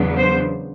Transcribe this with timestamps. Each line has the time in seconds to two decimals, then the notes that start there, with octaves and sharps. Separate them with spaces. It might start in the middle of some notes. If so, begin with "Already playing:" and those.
Already playing: E2 C#3 F#3 B3 D4
0.17 C5